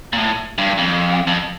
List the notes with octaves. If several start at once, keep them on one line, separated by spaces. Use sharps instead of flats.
A#2
A2
G2
F2
F2